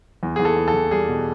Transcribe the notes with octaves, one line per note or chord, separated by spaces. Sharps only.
E2
E2 G#4
A4
E2
A4
E2
G3 G#4
B2